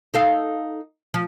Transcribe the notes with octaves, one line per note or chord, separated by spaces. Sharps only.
D#4 A4 F5
F3